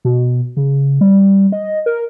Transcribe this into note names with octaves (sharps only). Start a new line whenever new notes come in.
B2
C#3
G3
D#5
A#4